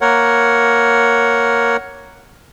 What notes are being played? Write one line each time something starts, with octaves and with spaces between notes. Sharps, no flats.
A#3 A#4 C#5 F#5